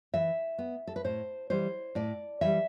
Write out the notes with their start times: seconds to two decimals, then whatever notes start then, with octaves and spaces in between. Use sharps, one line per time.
0.14 E3 E5
0.58 B3
0.87 A4
0.96 B4
1.04 A2 C5
1.50 E3 G3 C5
1.95 A2 D5
2.41 E3 G3 E5